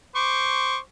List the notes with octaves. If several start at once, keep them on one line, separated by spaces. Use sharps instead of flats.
C5 C#6 D6